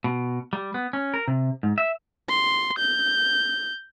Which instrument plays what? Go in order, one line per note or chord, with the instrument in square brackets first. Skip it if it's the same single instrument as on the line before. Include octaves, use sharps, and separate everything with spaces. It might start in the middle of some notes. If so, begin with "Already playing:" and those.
[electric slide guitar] B2
G3
B3
C#4
A#4
C3
G#2
E5
[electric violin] C6
G6